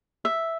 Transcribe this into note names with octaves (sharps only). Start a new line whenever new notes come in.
E5